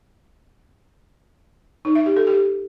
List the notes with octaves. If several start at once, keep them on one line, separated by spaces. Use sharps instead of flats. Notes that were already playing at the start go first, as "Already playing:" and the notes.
D#4
E5
G4
A4
G4